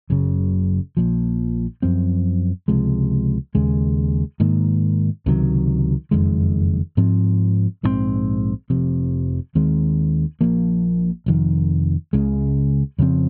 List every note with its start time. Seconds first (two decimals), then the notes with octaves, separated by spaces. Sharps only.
0.10 F#1 F#2 C#3
0.97 A#1 A#2 F3
1.82 F#2 F3 C4
2.68 C#2 C3 F3 G#3
3.55 D#2 C#3 G#3
4.40 G#2 D#3 A#3
5.26 C#2 C3 D#3 F#3
6.11 F#1 F2 D#3 G#3
6.97 G#2 F3 C4
7.83 A#1 G#2 F3 C4
8.70 F1 F2 C3
9.55 D#2 D#3 G#3 C4
10.41 A#1 A#2 F3 A#3
11.26 F1 F2 D#3
12.13 C#2 C#3 G#3
12.98 F2 C#3 F3 C4